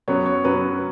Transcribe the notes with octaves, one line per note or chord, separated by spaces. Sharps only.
F#2 F#3 B3 C#5
C#5
F#2 F#3 B3 B4